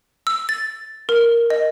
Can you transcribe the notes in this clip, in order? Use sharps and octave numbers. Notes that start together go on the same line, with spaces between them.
E6
A6
A#4
D#5